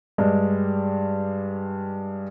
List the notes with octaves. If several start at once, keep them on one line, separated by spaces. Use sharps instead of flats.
G2 G3 G#3